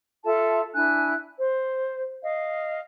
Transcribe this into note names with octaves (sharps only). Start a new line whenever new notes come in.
F4 A4 E5 A5
D4 E4 G#5 F#6
C5
D#5 F5